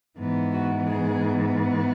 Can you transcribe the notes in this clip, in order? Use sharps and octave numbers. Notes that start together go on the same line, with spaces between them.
G#2 E3 B3
F#4
G#4